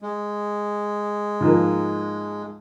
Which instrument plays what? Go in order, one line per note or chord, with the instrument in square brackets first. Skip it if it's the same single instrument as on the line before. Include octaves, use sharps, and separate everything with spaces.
[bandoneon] G#3
[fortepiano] G#2 F3 A#3